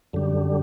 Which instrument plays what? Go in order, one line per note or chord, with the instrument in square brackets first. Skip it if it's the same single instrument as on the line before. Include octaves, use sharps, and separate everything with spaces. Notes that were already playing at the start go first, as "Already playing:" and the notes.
[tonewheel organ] F#2 D3 G3